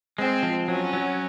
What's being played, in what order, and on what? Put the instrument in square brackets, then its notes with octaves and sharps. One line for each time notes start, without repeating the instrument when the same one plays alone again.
[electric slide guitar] G#3 [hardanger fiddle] C4
[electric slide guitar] F3
[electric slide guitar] F#3 [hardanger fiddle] C#4
[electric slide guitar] F#3